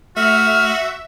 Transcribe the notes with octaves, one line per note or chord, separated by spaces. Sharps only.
A3 F#4 E5 F6